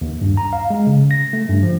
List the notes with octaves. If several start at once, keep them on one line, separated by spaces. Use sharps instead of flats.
D#2
G2
A#5
F5
G#3
C#3
A#6
A3
G2
F3